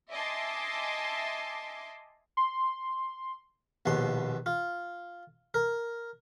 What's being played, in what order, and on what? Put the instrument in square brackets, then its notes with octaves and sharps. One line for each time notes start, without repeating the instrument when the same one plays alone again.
[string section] D#5 E5 G#5 A5 C6 D6
[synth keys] C6
[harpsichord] A#1 D#2 B2 C6
F4
A#4